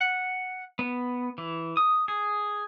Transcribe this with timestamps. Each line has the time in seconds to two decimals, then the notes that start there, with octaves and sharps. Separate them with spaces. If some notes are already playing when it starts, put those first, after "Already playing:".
0.01 F#5
0.79 B3
1.38 E3
1.77 D#6
2.08 G#4